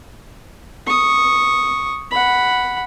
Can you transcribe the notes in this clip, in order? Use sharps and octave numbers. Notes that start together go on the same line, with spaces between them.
C#6 D#6
F#5 B5